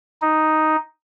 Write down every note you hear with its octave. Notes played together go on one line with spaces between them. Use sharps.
D#4